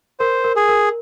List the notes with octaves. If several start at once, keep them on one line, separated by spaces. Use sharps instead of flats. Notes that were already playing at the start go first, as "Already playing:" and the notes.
A#4 C5
A#4
G#4
A#4